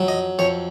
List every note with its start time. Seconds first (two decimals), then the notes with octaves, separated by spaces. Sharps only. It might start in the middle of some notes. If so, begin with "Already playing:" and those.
Already playing: F2 F#3
0.08 D#5
0.39 F2 C#5